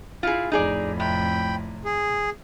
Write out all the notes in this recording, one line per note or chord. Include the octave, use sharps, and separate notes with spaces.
E4 F4 G#4
F2 A2 D#4 G#4 D5
C3 G5 B5
G#4